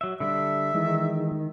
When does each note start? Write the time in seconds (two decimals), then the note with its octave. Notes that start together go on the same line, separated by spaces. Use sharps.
0.01 F#3 E5
0.20 D3 G3 D4 E5
0.74 D#3 E3 G#3 D#4